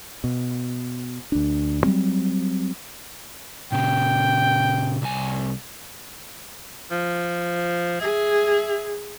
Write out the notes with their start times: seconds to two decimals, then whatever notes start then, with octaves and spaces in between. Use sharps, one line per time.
0.24 B2
1.32 D2 D4
1.84 F#3 G3 C4
3.72 A#2 C#3 G5
5.02 C2 G#5
6.91 F3
8.01 G#4 E5